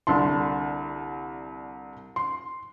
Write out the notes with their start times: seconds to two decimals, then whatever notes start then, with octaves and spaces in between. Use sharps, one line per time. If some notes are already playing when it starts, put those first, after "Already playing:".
0.07 C2 D3 A5 C6
2.16 C6